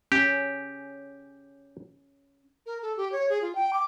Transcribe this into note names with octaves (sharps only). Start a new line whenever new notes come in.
C#4 G4
A#4
A4
G4
C#5
G#4
F4
G5
D6